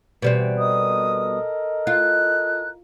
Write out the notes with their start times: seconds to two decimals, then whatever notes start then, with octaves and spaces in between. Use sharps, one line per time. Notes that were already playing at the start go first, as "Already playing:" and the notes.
0.22 B2 E3 G3 C4
0.59 A4 A#4 D#5 D#6
1.87 F4 F#6